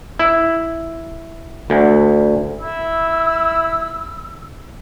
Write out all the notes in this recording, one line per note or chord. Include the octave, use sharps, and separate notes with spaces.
E4
D2
E4 E6